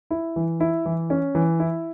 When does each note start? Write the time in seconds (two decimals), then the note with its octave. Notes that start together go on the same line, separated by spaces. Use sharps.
0.11 E4
0.36 E3
0.60 E4
0.86 E3
1.10 C#4
1.35 E3
1.60 E4